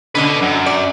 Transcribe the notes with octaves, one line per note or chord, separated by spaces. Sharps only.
D3 C#4 D4 B4 D#5
F#2
D5